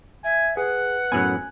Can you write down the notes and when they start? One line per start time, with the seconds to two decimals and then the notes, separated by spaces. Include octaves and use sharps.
0.24 E5 G#5
0.57 G#4 B4 F#5
1.12 F#2 A2 B3 G#5 F#6